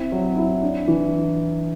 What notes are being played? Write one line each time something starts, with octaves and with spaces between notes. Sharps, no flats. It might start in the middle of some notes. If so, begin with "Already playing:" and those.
Already playing: C4 E4
F#3
E4
D4
E3